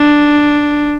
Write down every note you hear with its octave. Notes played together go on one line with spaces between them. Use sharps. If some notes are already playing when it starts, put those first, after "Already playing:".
Already playing: D4